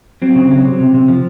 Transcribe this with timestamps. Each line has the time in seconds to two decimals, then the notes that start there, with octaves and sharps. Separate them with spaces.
0.22 F#3 C4
0.36 C#3
0.51 F#3
0.65 C3
0.80 C3
0.94 C3
1.08 F3